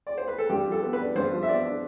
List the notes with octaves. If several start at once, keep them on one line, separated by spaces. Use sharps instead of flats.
D5
C5
B4
A4
G2 G4
F3 A4
B3
B4
D4
G2 C5
F3
E5
B3 D5
D4